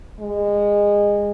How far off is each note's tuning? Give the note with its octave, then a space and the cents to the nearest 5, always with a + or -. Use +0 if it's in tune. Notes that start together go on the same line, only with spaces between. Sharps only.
G#3 -25